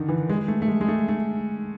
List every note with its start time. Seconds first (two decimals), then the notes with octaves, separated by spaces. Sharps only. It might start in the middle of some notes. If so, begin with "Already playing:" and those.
Already playing: D3 D#3
0.09 E3
0.29 G#3
0.48 A3
0.62 A3
0.68 G#3
0.81 G#3
0.88 A3
1.08 A3